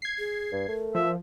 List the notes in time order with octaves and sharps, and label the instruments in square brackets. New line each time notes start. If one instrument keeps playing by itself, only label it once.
[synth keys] G#6 C7
[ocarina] G#4
[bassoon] G2
[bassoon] A3 [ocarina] A#4
[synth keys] F3 [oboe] E5